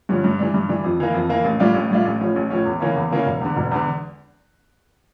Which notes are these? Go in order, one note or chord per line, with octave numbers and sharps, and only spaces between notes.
G2 D3 F3 C#4
G2
E3 G3 D4
G2
E3 G3 D4
F2
E3 A#3
F2
E3 A#3
A1
A2 G3 D4 F4
A1
A2 G3 D4 F4
A1
A2 F3 C#4
A1
A2 F3 C#4
E2
C#3 E3 A#3 C#4
E2
C#3 E3 A#3 C#4
E1
E2 D3
E1
E2 D3